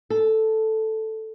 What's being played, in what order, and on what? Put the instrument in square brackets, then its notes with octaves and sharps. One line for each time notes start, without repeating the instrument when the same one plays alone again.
[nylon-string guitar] A4